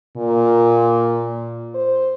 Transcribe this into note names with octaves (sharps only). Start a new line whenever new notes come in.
A#2
C5